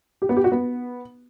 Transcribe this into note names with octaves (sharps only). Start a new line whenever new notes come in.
G4
B3
G4
F#4
B3